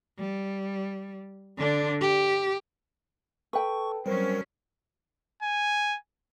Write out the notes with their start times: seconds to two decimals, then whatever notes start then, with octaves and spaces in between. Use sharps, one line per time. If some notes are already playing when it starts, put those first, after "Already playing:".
0.18 G3
1.58 D3 D4
2.01 G4
3.53 A4 B4 G5 C#6
4.06 F#3 G3 C4 C#4 A#4
5.43 G#5